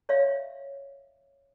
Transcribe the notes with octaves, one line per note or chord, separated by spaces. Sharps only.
C#5 D5 E5 F5